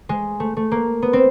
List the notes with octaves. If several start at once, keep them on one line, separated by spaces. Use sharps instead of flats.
G#3
A3
A3
A#3
B3
C4